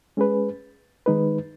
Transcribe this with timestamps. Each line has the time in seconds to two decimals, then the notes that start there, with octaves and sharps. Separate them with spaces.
0.17 G#3 C#4 G#4 B4
1.06 D#3 G#3 D#4 B4